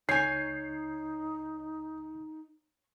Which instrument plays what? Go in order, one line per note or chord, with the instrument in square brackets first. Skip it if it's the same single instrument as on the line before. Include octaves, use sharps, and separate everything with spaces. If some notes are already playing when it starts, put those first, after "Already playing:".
[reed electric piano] C#2 G6 [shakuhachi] D#4 [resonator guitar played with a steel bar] C#5 G#5 [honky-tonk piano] C7